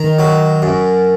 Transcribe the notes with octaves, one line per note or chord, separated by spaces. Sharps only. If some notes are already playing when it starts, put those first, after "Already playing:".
Already playing: D#3 A#5
F#3
F#2